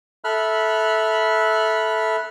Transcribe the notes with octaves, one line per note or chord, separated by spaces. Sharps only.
A4 E5 B5 F6 F#6